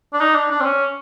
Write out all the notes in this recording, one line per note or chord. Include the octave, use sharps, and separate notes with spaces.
D4
D#4
D4
D4
C4
C#4